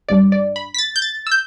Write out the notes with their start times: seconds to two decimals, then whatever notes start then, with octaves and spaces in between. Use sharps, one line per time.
0.09 A1 G2 G3 D4 D5
0.32 D5
0.56 B5
0.74 B6
0.78 A6
0.96 G6
1.02 A6
1.27 E6
1.32 G6